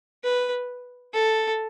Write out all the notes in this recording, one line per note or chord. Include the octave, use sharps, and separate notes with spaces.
B4
A4